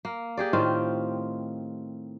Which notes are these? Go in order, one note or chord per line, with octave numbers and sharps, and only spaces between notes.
A#3
G4 G#4 D5
A2 D#3 C4 F4